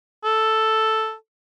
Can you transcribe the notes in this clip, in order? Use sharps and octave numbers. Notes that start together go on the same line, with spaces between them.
A4